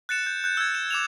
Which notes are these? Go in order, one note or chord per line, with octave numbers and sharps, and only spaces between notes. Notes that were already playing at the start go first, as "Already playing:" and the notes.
F#6 A6 C#7 E7
G6
F#6 G6
E6 F#6 G#6
E7
D6 E7 F7